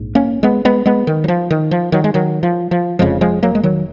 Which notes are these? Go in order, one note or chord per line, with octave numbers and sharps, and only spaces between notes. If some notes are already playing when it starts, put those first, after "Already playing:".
Already playing: A#1 G#2
A#3 C#4
G#3 B3
G#3 B3
G#3 B3
D#3
F#3
F3
D#3
F3
D#3 F#3
G#3
D#3 F#3
F3
F3
F1 F2 C#3 F3 G#3
F3 G#3
F#3 A#3
G#3
D#3 F#3